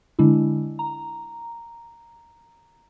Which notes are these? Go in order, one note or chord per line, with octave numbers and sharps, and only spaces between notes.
D3 G#3 D4 E4
A#5